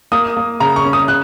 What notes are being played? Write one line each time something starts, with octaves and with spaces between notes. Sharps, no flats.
A#3 D#6
A#3
C#3 A#5
C#6
C#4
D#6
C#3 F#6